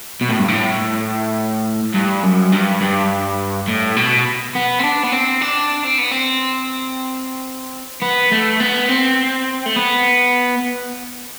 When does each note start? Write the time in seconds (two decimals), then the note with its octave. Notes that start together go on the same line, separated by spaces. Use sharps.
0.21 B2
0.29 A2
0.39 G2
0.48 A2
1.95 G2
2.23 F#2
2.52 G2
2.81 G2
3.68 A2
3.96 B2
4.55 B3
4.79 C4
4.84 D4
5.04 B3
5.13 C4
5.42 D4
5.84 C4
5.98 B3
6.12 C4
8.02 B3
8.31 A3
8.60 B3
8.89 C4
9.66 A3
9.76 B3